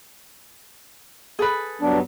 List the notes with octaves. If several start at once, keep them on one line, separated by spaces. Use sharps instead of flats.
G#4 A4 B4
G2 F#3 B3 D4